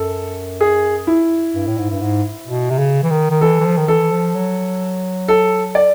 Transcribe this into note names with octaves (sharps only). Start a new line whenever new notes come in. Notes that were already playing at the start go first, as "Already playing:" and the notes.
Already playing: F#2 A4
G#4
E4
G2
A2
G#2
G2
G#2
B2
C3
C#3
E3
D#3
D#3
E3 A4
E3
F3
D#3
E3 A4
F3
F#3
A4
D5